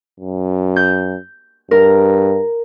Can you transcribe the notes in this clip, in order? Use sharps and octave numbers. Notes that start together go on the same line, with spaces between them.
F#2
G6
G2 A#4